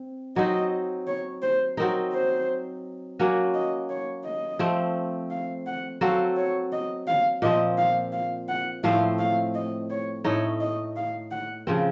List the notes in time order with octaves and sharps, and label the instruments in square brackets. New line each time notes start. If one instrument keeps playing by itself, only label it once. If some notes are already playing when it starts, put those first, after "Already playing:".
Already playing: [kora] C4
[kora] F#3 C4 D#4 [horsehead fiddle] D#5
[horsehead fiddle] C#5
C5
[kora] F#3 C4 D#4 [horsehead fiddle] A#4
[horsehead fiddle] C5
[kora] F#3 A#3 C#4 F#4
[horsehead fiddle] D#5
C#5
D#5
[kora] F3 A3 C4
[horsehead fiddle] F5
F#5
[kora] F#3 C4 F#4 A4 [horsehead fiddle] F5
[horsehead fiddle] C#5
D#5
F5
[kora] A#2 F3 C4 [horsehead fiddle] D#5
[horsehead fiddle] F5
F5
F#5
[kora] A2 F3 A3 C4 [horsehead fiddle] F5
[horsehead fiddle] F5
D#5
C#5
[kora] A2 A3 D#4 [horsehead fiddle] C#5
[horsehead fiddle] D#5
F5
F#5
[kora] C#3 F3 C4